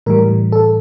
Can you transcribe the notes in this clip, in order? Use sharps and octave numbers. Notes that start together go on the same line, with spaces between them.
A2 E3 G3 A#4
A4